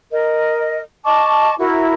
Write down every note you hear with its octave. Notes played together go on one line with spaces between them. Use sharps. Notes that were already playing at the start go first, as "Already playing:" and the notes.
A#4 D#5
D#5 A5 C#6 D6
E4 F#4 A#4